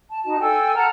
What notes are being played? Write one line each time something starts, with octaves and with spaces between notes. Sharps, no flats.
A5
D#4 F#4 D#5 A5
A4 G5 G#5 E6
F#5 A5 A#5 F6